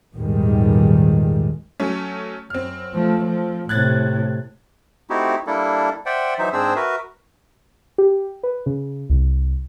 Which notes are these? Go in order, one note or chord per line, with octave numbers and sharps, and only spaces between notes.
A#1 E2 G#2 D#3 G3 G#3
F#3 A3 C#4
F#2 C4 F6
F3 A3
F3
A2 C3 F#6 G#6 A6
A3 C4 D#4 E4 F#4 G4
G3 A#3 D4 E4 A4
C5 D5 E5 F#5 G5
E3 F#3 D#4 C5 E5
G#2 C4 D4 G#4 C5 E6
F#4 A#4 B4 E5
G4
B4
C#3
C2